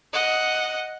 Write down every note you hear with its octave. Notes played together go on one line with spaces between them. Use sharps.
D#5 F#5